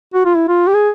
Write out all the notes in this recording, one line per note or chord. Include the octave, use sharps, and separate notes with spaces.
F#4
F4
E4
F4
G4
G#4